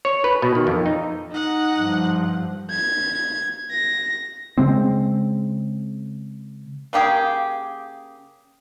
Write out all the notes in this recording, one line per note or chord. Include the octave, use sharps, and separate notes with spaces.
C#5
B4
B2
D#3
F2
D#4
D#4 F#5
G2 F3
G#6
A#6
C#3 G#3 C4
C#3 A#3 G4 G#4